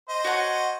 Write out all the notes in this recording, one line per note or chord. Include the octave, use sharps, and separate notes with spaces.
C5 D#5
F#4 C#5 F#5 A5